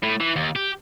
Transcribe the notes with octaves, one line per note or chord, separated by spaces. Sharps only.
A2
E3
D#2
G4